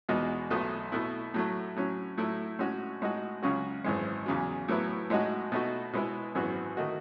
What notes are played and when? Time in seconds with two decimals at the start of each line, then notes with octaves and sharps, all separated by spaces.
0.09 E2 B2 G#3 D#4 F#4
0.50 B1 B2 A3
0.92 B2 A3 E4
1.34 A2 F#3 A3
1.76 A2 F#3 C#4
2.17 A2 F#3 A3 E4
2.59 A2 G#3 C#4 F#4
3.02 A2 G#3 D#4 F#4
3.42 C#2 C#3 F#3 C#4 F#4
3.84 G#1 F#2 E3 G#3
4.26 E2 C#3 F#3
4.68 A2 F#3 B3 E4
5.10 A2 G#3 D#4 F#4
5.52 B2 A3 D#4 F#4
5.93 B2 G#3 B3 E4
6.35 G#1 F#2 E3 B3 F#4
6.77 D#3 A3 D#4 F#4